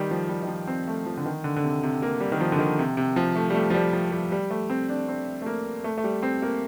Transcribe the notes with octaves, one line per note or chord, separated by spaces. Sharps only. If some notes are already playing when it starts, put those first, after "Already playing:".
Already playing: D#3 G3
F3
G3
D#3
F3
C4
A3
F3
D3
D#3
D3
D3
C3
C3
A#3
G3
D#3
F3
D3
D#3
C3
C3
F3
A3
G3
A3
F3
G3
F3
G3
G3
A3
C4
D4
C4
A3
A#3
A3
A3
G3
C4
A#3